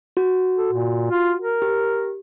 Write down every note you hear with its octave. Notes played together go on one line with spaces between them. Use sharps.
F#4
A4
A#2
F4
A#4
G4